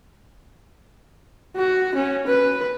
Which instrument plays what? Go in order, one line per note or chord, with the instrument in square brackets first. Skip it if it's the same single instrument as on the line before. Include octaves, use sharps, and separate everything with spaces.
[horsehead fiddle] F#4
C#4
B4